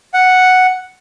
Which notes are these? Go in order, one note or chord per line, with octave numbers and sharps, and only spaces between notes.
F#5